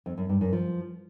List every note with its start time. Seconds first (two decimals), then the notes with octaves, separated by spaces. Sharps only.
0.06 F2
0.18 F#2
0.29 G2
0.41 F#2
0.53 F3